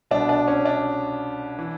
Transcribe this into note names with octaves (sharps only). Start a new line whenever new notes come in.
C2 B2 D4
D4
C#4
D4
E3